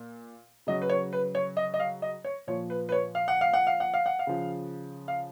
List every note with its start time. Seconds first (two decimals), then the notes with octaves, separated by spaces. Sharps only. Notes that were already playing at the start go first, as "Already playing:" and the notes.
Already playing: A#2
0.67 C#3 F#3 D#5
0.82 B4
0.90 C#5
1.13 B4
1.35 C#5
1.57 D#5
1.74 D#5
1.80 F5
2.02 D#5
2.24 C#5
2.47 A#2 F3 C#5
2.70 B4
2.89 B4
2.92 C#5
3.15 F5
3.28 F#5
3.41 F5
3.54 F#5
3.67 F5
3.80 F#5
3.94 F5
4.06 F#5
4.19 F5
4.27 C#3 F3
5.08 F5